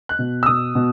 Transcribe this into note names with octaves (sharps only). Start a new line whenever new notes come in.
F#6
B2
E6
B2 D#6
B2